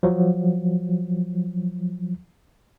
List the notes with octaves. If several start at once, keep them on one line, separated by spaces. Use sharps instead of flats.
F3 F#3